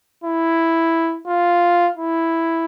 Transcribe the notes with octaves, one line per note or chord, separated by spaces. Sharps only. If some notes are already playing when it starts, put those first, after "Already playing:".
E4
F4
E4